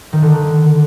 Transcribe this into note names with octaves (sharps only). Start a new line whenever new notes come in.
D#3
D3